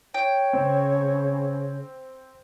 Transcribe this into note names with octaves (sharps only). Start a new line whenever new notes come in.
C#5 G5
C#3 C4